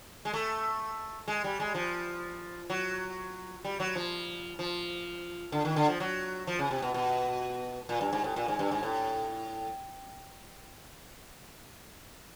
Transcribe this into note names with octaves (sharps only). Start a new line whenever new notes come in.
G#3
A3
G#3
G3
G#3
F3
F#3
G3
F#3
F3
F3
D3
D#3
D3
F3
F#3
F3
C#3
C3
B2
B2
A#2
G2
G#2
A2
A#2
G#2
G2
G#2
A2